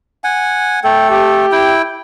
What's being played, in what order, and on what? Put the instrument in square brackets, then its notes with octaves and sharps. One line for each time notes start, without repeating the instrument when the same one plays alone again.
[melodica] F#5 G#5
[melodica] A3 A4 [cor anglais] G5
[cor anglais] G4
[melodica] E4 G5